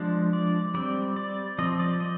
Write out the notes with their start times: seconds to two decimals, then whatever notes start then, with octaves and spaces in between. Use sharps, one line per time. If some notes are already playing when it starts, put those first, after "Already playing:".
Already playing: F3 G#3 D4
0.33 D5
0.74 G3 C4 D5
1.16 D5
1.58 F3 C4 D#5
1.80 D5
2.00 D#5